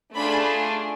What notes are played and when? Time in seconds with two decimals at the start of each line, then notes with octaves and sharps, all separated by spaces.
0.14 A3 D4 F4 G#4 B5